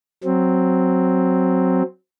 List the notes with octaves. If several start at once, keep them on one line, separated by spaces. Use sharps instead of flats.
F#3 C4